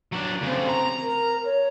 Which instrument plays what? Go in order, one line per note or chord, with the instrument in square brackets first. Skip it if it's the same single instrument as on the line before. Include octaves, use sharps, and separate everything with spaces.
[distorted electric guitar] F#3 D4
[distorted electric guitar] A2 C#3 [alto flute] C4
[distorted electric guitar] A#5
[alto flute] A#4
C#5